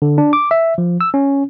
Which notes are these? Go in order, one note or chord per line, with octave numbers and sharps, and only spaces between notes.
D3
D4
D6
E5
F3
E6
C#4